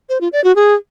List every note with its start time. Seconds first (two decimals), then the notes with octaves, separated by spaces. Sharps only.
0.09 C5
0.21 F4
0.32 D5
0.44 F#4
0.56 G#4